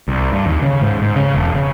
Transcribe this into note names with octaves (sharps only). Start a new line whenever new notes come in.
C2
G2
D#2
C#3
G#2
G#2
C#3
E1
C#3